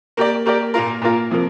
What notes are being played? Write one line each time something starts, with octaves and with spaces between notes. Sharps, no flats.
A#3 G4 A#4 D5
A#3 G4 A#4 D5
A#2 A#3 F4 A#4
A#2 A#3 F4 A#4
C3 F3 A#3